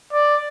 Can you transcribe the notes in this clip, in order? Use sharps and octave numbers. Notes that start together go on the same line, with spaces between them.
D5